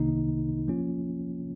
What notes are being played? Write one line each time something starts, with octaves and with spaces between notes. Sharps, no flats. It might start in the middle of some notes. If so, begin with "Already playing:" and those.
Already playing: C2 C3 D#3 A#3 D#4
F3 A#3 C#4 F4